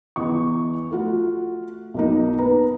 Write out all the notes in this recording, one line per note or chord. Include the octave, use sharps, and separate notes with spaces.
E2 D#5 C#6
A3 F4 F#4
B1 A#3 D#4
B3 B4 A#5